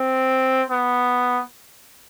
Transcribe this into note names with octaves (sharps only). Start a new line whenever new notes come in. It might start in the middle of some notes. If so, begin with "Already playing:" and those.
Already playing: C4
B3